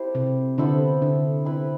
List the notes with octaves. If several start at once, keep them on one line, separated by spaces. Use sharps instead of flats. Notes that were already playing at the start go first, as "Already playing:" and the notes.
Already playing: C4 E4 G4 A4 C5
C3
D3 B3 E4 A4 C5
D3
C4 E4 B4